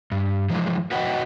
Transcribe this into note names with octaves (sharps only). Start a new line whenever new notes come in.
G2
E3 F3 G#3
F#4 B4 C#5 D#5 F#5 G5